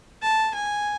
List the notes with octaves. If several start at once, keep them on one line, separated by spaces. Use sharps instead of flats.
A5
G#5